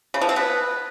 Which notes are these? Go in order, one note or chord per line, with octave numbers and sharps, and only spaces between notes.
C#3
F3
C4
B3